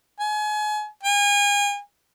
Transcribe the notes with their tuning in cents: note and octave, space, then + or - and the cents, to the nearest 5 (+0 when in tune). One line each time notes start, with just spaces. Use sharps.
G#5 +35
G#5 -35